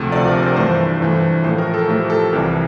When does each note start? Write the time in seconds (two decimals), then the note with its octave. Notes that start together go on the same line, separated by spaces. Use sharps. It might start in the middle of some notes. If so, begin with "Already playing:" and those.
Already playing: D2 C3 F3 A3
0.12 D2 C3 F3 A3 D5
0.28 A#4
0.43 C5
0.56 G2 E3 A3 C5
1.01 G2 E3 A3
1.44 A2 F3 A3 C5
1.58 A#4
1.74 A4
1.88 A2 F3 A3 G4
2.10 A4
2.32 C2 C3 E3 A#4